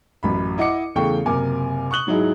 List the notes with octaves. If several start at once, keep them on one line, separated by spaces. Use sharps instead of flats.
A1 F#2 B5
E4 D#5 F#5 D6 C#7
E2 C#3 A3 G5 C#6
F#1 C3 A#4 G#5 D6
C#6 D#6 F#6 F#7 G7
G#2 F#3 D#4 E4 G#4